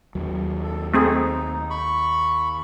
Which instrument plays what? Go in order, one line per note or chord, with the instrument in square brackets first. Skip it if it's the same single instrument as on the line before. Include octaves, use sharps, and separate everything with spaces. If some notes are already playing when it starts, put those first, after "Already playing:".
[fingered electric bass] D#2 F#3
[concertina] A4
[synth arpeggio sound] A3 C4 G#4 [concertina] D#4
[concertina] B5 C#6